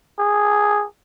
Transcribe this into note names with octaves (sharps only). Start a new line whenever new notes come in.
G#4